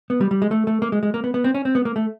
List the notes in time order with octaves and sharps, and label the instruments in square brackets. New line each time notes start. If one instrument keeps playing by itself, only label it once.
[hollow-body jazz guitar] B3
G3
G3
G#3
A3
A3
A#3
G#3
G#3
A#3
B3
B3
C4
C#4
C4
B3
A#3
A3